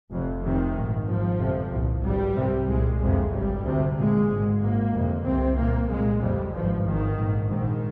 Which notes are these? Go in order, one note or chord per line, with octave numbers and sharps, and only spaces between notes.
F1 F2 C3
F1 F2 C3 D#3
A#1 G#2
G#1 G#2 F3
G1 F2 C3
C2 A#2
G#1 G2 G3
C2 C3
C2 A#2 G#3
G1 F2 C3 G#3
G#1 G2 G3
D2 C3
A#1 A#2 G#3
G#1 G#2
G#1 G#2 A#3
G1 F2 C3
C2 C3 C4
C2 A#2 A#3
C2 A#2 G#3
G1 F2 C3 G3
G#1 G2 F3
G#1 G2 D#3
A#1 G#2
A#1 G#2 D#3